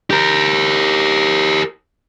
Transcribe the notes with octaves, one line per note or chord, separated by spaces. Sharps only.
G4 A#4